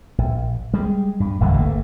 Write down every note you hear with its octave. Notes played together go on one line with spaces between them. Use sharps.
A#1
G3 G#3
G2
D1 A1 D#2 D3
G1 A3 A#3